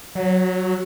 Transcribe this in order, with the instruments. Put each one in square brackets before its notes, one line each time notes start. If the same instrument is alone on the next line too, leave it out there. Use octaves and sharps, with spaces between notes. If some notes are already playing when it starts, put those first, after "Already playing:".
[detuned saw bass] F#3